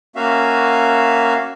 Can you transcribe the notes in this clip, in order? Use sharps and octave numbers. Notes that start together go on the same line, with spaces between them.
A#3 C#4 F#4 E5 F5